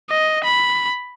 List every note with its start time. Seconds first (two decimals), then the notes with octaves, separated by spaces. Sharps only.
0.10 D#5
0.44 B5